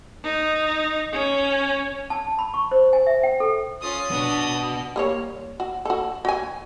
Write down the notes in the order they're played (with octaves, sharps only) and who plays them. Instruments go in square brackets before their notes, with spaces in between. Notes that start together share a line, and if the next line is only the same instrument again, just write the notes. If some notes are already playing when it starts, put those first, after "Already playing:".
[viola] D#4
C#4
[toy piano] A5
B5
C#6
C5
G#5
E5
G5
A4
[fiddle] C#4 F4 [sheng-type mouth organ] D#6
[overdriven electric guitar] B3 F#4 [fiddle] D4 B4
[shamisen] G3 A#3 C#5
F#4
F#4 A4
F#4 G#5